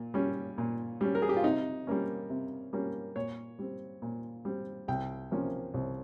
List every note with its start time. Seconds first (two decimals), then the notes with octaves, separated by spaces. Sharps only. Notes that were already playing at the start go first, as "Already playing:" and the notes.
Already playing: A#2
0.14 G3 C#4
0.58 A#2
1.01 G3 C#4
1.15 A#4
1.22 G#4
1.29 G4
1.36 F4
1.44 C3 D#4
1.87 G3 A#3 C#4
2.30 C3
2.73 G3 A#3 C#4
3.16 A#2 C#5
3.59 G3 C4
4.02 A#2
4.45 G3 C4
4.88 C2 G5
5.31 C3 F3 A#3 C#4
5.74 C2